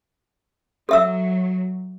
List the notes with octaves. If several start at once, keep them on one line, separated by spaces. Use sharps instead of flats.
F#3 A4 E5 E6